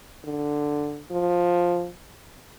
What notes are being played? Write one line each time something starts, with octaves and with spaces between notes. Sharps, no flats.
D3
F3